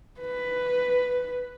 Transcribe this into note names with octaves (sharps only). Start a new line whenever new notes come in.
B4